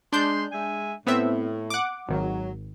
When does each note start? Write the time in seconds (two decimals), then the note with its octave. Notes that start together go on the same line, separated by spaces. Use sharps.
0.13 G#3 D4 D#5 C6 G6
0.52 G#3 E5 G#5
1.07 A2 B3 C4 E5
1.70 F#5 D6
2.09 G#1 D#3 F#3